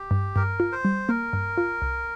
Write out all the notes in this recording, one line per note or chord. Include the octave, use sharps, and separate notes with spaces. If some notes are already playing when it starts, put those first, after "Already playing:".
Already playing: G4
G2
G2 A#4
F4
C5
G3
A#3 A#4
G2
F4
C2